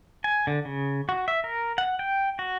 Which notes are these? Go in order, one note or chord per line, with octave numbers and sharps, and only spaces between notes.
G#5
D3
C#3
F#4
E5
A#4
F#5
G5
F#4